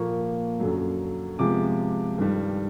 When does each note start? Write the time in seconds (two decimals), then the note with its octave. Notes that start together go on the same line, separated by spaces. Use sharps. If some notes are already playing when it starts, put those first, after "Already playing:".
Already playing: A#2 F3 A#3 C#6
0.60 F#2 D3 F#3
1.39 C3 F3 G#3 B3 D6
2.18 G2 D#3 G3